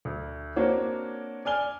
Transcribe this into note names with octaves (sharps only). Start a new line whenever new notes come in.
D2
A#3 C4 D4 F#4 C#5
D5 G#5 F6 G7